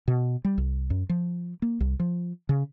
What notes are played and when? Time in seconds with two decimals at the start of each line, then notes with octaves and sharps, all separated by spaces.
0.08 B2
0.45 G3
0.58 C2
0.90 F#2
1.09 F3
1.62 A#3
1.80 C2
2.00 F3
2.49 C#3